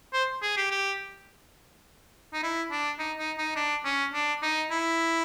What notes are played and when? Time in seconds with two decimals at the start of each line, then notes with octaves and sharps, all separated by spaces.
0.13 C5
0.42 G#4
0.57 G4
0.71 G4
2.34 D#4
2.43 E4
2.71 D4
2.99 D#4
3.18 D#4
3.38 D#4
3.56 D4
3.85 C#4
4.13 D4
4.42 D#4
4.71 E4